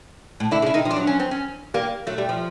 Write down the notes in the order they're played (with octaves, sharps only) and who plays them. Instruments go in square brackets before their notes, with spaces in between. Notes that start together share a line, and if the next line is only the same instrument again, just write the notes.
[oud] A2
[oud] D3 [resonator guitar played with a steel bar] E4
[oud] C#3
[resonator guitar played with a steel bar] E4
[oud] D#3 [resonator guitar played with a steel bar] D#4
[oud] F3
[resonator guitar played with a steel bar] D4
[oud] F#3
[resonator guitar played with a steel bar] C#4
C4
C#4
[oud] G3 [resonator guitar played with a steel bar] A#3
[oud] F#3 [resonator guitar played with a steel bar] A3
[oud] G3
F3